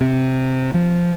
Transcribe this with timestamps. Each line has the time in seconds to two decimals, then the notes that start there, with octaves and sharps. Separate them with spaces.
0.01 C3
0.74 F3